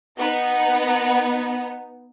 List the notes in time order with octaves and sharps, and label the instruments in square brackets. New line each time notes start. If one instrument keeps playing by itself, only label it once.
[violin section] B3 D#4